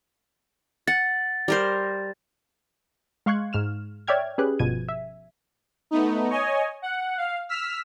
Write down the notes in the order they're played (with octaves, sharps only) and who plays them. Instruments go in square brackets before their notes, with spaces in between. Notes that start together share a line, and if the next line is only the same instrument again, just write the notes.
[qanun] F#5 [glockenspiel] A6
[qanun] G3 A#4 C5
[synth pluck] G#3 F5 C6 C#6 F#6 G#6
G#2 F6 E7
C#5 D5 E5 G5 F6 G#6
C#4 G4 G#4 B4 F#6
G1 B2 F3 G#6 D#7
E5
[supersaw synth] A3 B3 D#4
C#5 D#5 G#5
F#5
F5
E6 F6 B6